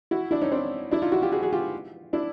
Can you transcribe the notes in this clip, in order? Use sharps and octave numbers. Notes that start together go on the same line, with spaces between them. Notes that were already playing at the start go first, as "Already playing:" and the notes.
E4 F#4
D4 E4
C#4 D#4
C4 D4
D4 E4
D#4 F4
E4 F#4
F4 G4
F#4 G#4
F#4 G#4
F4 G4
D4 E4